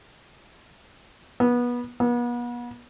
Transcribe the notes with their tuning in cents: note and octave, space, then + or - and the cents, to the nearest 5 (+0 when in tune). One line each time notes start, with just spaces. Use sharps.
B3 -25
B3 -40